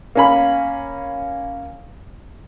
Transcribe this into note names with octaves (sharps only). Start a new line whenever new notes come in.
A#3 C#4 B5